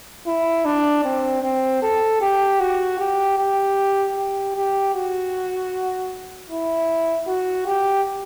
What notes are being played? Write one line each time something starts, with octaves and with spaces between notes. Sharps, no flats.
E4
D4
C4
C4
A4
G4
F#4
G4
G4
G4
G4
F#4
E4
F#4
G4